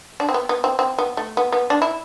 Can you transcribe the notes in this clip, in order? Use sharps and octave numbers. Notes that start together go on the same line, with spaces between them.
D4
C4
B3
B3
C4
C4
B3
A3
B3
B3
D4
E4